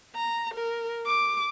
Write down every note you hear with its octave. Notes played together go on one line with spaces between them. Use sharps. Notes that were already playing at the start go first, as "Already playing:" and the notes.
A#5
A#4
D6